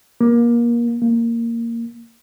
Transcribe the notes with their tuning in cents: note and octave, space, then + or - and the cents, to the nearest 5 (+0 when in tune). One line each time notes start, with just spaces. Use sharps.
A#3 +25
A#3 -10